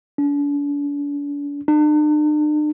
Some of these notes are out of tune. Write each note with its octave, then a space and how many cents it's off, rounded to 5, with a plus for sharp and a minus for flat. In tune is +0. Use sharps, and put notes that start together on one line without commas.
D4 -40
D4 +45